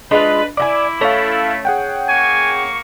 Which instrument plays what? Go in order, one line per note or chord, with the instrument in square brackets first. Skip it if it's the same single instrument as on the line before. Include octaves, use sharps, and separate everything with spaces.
[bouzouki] G#3 F4 [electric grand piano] D4 [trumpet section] B4
[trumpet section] E4 [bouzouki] D5 D#5 G#5 [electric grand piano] D6
[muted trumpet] A3 [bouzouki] C#4 [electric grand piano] A4 F5
[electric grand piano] G#4 F#5 G5
[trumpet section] A#3 C#6 [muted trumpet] G#5